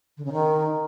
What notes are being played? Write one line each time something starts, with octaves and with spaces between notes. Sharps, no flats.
D3
C#3
D#3